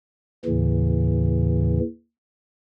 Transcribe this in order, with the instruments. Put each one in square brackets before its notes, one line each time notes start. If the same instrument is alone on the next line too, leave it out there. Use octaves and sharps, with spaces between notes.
[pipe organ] D#2 A2 C#3 E3